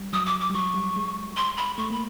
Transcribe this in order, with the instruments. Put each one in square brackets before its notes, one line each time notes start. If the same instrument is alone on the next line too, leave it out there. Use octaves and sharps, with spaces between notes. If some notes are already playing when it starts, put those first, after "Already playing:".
Already playing: [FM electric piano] G3
[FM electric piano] F#3 [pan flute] D#6
[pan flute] D6
D6
[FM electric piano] G3
[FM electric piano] F#3 [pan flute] C#6
[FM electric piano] G3
G#3
[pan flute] C6
B5
[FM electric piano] A3 [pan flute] C#6
[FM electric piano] A#3 [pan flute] B5